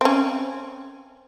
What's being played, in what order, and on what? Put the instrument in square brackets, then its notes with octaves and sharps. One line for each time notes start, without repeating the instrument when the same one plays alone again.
[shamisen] C4 C#4